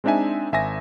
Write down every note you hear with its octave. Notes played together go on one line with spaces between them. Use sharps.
G#3 C4 D4 D#4 E5 G#5
G#1 E5 G#5 A#6